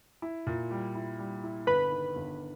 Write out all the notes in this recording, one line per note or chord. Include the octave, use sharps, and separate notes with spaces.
E4
A#2
G3
E4
G3
E4
G1 B4 B5
D#3
G1